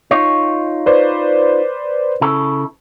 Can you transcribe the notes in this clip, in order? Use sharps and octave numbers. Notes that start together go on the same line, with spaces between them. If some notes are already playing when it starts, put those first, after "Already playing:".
D#4 F4 C#5
B4 C5 D5
C#3 E4 A4